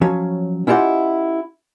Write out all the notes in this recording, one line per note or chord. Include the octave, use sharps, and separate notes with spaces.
F3 F#3 C#4
C#4 E4 F4 G4 D#5 F#5